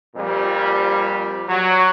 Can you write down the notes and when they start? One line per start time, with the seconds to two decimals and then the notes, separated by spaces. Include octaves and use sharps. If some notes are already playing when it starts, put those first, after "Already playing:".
0.16 F2 A#2 G3
1.49 F#3